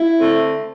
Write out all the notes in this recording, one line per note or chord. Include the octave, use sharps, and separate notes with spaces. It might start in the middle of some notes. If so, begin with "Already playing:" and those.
Already playing: E4
D3 A3 C4